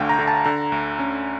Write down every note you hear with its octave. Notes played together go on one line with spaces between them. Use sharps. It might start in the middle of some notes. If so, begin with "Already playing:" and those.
Already playing: D2 D3 A3 F5 G5
A#5
D3
A5
D3 A#5
D2
C#4